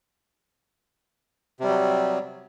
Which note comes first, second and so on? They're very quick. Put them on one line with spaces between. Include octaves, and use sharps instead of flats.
C3 G3 F#3